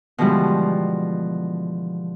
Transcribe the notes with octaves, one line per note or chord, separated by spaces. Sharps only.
B2 D3 E3 F3 G3 G#3